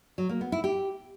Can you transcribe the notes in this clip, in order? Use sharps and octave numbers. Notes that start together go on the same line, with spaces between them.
F#3
A#3
B3
E4
G4